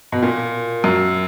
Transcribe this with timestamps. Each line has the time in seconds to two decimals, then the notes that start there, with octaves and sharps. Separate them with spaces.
0.12 B2
0.22 A#2
0.84 F#2